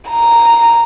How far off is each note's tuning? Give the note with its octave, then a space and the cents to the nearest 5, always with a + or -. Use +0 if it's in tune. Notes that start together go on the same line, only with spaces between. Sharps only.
A#5 -5